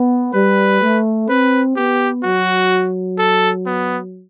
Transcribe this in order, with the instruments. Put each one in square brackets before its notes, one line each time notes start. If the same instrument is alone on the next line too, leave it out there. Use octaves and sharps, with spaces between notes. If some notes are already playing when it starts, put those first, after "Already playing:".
Already playing: [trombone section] B3
[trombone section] G3 [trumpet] B4
[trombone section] A3
[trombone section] C4 [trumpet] B4
[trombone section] B3 [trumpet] G4
[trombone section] F#3 [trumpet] F#4
[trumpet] A4
B3